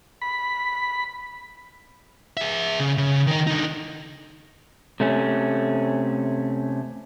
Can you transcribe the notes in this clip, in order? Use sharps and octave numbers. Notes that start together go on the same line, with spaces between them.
B5
G#4 E5
C#3
C#3
D#3 D#4
D3 D#4
C3 A3 C#4